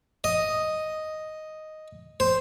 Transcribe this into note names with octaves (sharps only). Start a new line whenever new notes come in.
D#5
C5